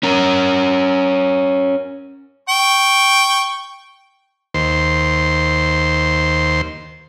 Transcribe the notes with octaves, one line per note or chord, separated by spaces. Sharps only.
C#4 A#4
G5 C#6
D#2 C5